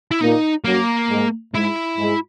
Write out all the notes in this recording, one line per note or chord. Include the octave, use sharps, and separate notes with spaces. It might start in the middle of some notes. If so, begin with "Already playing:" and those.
E4
A#2 A#3 D#4
F#2 F#3 A#3
G#2 G#3
G#2 G#3 E4
G#2 G#3